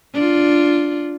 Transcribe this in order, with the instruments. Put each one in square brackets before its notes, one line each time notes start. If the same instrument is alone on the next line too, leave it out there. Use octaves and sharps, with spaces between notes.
[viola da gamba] D4 F4